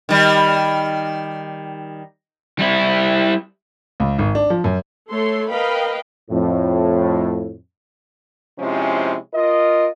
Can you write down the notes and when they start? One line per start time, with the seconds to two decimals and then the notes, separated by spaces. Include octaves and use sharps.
0.09 D#3 G3
2.59 G3 E4
4.00 C#2
4.19 G#1
4.35 D4
4.50 F3
4.64 F#2
5.09 A3 A4 C#5 C6
5.49 A#4 B4 D#5 F5 G5 B5
6.30 F2 A2
8.59 C3 F3 G#3 C#4 E4
9.34 F4 A#4 D#5